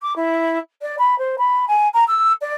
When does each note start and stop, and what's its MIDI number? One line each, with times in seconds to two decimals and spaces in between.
0.01 0.13 86
0.16 0.58 64
0.81 0.95 74
0.98 1.17 83
1.18 1.36 72
1.38 1.65 83
1.67 1.88 80
1.93 2.04 82
2.07 2.32 88
2.41 2.56 74